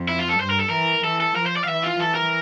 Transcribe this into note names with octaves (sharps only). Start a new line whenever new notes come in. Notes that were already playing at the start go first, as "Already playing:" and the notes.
Already playing: F2
E4
F4
A4
G2 C5
A#4
A4
E3 A#4
E3 A4
A4
F3 A#4
C5
D5
F5
E3 E5
F4
E3 A4
A#4